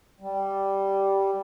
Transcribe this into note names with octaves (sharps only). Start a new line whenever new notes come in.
G3